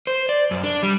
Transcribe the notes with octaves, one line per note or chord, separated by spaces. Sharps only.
C5
D5
F#2
D4
G3